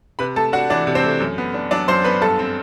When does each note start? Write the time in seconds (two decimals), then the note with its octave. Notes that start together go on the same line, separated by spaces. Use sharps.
0.19 C3 B4 B5
0.36 A3 A4 A5
0.53 D4 F#4 F#5
0.70 E3 D4 D5
0.87 C3
0.95 C4 C5
1.04 A3
1.20 F#2
1.38 B3
1.54 D4
1.71 F#3 D4 D5
1.88 F#2 C5 C6
2.04 B3 B4 B5
2.22 G2 A4 A5
2.39 C4